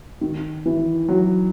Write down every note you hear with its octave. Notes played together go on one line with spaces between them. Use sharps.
D#3
E3
F#3